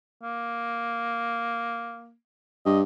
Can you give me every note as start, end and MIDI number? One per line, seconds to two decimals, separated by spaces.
0.23 2.14 58
2.66 2.83 43
2.66 2.79 75